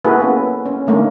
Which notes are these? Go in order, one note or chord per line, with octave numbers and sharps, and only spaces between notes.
A#3 E4 F#4 G#4 A4 B4
B3 C#4
C#4
D3 A3 A#3 C#4 D#4